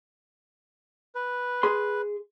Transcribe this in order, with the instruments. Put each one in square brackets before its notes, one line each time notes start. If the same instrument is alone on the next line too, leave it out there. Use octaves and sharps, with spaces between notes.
[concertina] B4
[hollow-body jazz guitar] G#4 C6